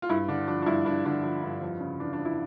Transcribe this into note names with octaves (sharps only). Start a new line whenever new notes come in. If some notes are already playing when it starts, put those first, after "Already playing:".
F4
G2 E4
D3 D4
F3 D4
D4
G2 E4
G2 D4
D3 D4
F3
G2
F2
C#3
E3 D4
D4
F2
E4